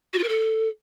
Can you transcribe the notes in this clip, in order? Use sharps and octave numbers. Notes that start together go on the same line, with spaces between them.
F#4
F4
A#4
A4